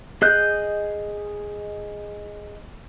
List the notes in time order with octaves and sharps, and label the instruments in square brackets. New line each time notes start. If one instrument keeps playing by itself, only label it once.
[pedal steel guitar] G#4 D#5 F#6 G6